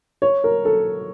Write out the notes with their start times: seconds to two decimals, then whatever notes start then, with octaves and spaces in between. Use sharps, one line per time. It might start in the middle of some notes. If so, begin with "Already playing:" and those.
0.22 C#5
0.44 A#4
0.65 A4